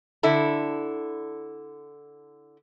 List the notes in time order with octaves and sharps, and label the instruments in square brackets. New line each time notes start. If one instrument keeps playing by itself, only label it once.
[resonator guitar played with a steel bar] D3 E4 A4